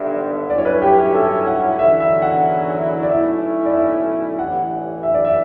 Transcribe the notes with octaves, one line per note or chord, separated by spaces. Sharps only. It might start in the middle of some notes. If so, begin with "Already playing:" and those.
Already playing: G1 G2 D3 E5
G2 F#3 A3 C#4 E4 D5
C#5
B4
G4
G4
A4
F#5
E2 D3 F#3 C#4 E4 E5
E5
F#5
D5
B1 B2 A3 C#4 E4 E5
D5
E5
A1 G2 E3 F#5
E5
D5
E5